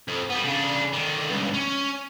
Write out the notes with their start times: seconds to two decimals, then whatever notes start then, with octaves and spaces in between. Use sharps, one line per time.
0.08 F2
0.30 G3 B3
0.44 C#3 D4
0.93 D3 D#3
1.30 C#2 G2
1.54 C#4